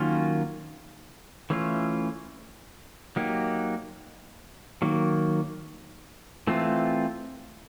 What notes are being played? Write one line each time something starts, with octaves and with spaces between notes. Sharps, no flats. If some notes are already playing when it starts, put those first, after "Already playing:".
Already playing: D#3 F#3 A#3 C#4 F4
E3 A3 C#4 F4
F#3 A#3 D#4 G4
D#3 F#3 A#3
E3 A3 C4 F4